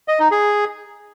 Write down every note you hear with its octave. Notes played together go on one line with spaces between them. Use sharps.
D#5
D#4
G#4